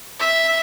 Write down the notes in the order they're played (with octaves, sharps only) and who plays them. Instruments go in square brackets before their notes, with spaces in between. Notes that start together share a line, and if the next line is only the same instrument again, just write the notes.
[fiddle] E5